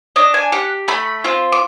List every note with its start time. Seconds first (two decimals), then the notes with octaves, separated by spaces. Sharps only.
0.16 D4 D#5
0.34 G#5
0.52 G4 F#5
0.88 A3 B5
1.24 C4 F4
1.52 D6